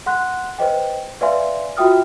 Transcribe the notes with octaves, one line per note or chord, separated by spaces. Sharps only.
F#5 C6 F#6
B4 C5 D#5 G5
B4 D5 E5 F5 G#5 C6
F4 F#4 E5 G5 D#6 F6